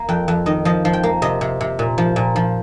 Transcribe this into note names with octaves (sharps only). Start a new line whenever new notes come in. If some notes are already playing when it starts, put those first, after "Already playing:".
Already playing: A#3
F2 G5
F2
D#3 D#5
F3 D#5
F3
G5
A#3
C3 D#5
C3
C3
A#2
F3
A#2
F3